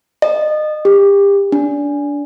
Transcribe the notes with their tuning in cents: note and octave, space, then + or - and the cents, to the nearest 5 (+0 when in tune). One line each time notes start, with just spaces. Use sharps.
D#5 -30
G4 +30
D4 -20